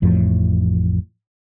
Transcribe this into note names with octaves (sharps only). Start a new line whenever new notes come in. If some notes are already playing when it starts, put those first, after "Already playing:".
A1 F2 A2 F3